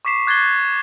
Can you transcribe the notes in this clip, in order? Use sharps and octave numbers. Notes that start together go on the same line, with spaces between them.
C#6 D6 B6 C7 E7
D6 F#6 G#6 A6 C7 G7